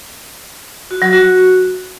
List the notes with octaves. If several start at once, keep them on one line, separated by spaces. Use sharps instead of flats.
F#4
F#3
F#4